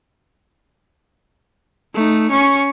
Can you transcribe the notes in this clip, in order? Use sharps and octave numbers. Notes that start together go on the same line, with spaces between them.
A3 D#4
C#4 C#6